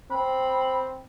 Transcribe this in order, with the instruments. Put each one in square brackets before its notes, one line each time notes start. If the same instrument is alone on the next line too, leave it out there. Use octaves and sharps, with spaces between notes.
[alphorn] C4 [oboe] B5